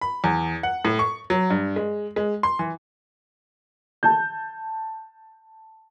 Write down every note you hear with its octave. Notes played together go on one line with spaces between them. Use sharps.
B5
E2
F#5
A2
C#6
F#3
G2
G#3
G#3
C6
E3
A5 G6